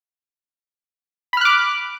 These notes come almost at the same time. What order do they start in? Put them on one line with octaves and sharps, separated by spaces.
B5 F6 F#6 D6